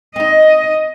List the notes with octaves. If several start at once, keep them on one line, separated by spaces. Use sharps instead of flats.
C4 D#4 D#5